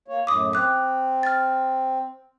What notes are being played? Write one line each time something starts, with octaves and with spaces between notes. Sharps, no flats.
A#3 C#5
F#2 A2 D6 D#6
C4 D6 F#6
F6 A6